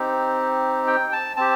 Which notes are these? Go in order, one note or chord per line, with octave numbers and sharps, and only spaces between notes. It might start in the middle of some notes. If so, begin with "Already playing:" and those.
Already playing: C4 D#4 G4
G5
A5
C4 G4 A5